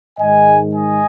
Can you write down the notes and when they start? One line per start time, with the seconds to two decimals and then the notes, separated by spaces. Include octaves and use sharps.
0.18 G#2 D#3 G#3 D#5 G#5
0.74 D#5 G#5